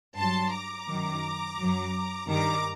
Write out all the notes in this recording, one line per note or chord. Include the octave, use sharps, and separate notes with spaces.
G2 F#3 A5 C6
A#5 D6
F#2 D#3 F#3
F#2 F#3
G2 D#3 G3 A#5 D6